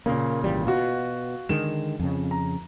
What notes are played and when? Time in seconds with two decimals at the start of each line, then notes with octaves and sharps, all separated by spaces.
0.06 A#2 C#3 A#3
0.44 G#1 E3 G3
0.67 B2 F4 F#4
1.49 D3 D#3 G#3 E7
1.99 F2 C#3
2.31 A#5